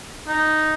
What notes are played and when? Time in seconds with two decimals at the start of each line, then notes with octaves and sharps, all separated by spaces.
0.28 D#4